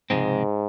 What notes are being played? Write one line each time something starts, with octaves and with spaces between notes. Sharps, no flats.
C#2 G#2 C3 F3 G#3 C4